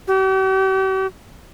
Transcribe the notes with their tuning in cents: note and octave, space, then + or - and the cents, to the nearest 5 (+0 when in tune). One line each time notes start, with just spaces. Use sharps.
G4 -45